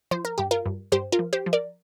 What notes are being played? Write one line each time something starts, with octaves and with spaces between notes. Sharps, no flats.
F3 C5
A#4
G2 G4
F4 A#4
G2
G2 G4 C5
F4 A#4
F3
G4 C5
F3
A#4 D5